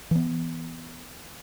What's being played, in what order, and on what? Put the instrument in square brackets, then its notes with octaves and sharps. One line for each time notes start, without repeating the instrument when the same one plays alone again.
[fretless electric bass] E3 B3